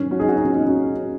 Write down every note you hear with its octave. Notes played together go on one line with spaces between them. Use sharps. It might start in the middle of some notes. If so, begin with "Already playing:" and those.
Already playing: G#2 D#3 F#3 C#4
C#4 F#4
D#4 G#4
C#4 F#4
D#4
C#4
D#4
C#4 F#4